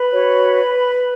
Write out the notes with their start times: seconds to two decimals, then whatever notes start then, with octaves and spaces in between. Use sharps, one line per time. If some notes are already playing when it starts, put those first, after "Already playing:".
Already playing: B4 B5
0.10 F#4 C#5